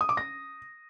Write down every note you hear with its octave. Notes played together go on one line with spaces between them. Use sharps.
D#6
D6
A#6